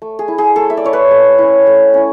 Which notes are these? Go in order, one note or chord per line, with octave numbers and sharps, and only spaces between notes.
A3
G#4
E4
G#4
A3 A4
E5
D5
E4 C#5
B4
A3
C#4 E4
A3
C#4 E4